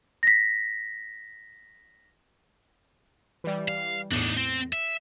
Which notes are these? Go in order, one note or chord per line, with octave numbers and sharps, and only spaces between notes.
A#6 B6
E3 G3
F5
E2 A2 D4 D#4
C4
E5